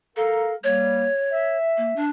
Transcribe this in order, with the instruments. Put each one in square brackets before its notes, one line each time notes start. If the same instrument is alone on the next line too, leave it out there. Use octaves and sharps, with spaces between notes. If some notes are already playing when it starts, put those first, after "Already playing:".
[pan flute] A4 [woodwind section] A#4 F5 A#5
[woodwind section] G3 A#3 [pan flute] C#5
[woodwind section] E5
[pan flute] A#3
D4